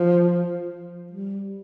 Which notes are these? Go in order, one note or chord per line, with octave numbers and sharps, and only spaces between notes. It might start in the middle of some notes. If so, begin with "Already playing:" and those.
Already playing: F3
G3